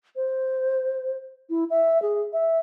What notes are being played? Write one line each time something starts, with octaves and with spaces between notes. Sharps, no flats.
C5
E4
E5
G#4
E5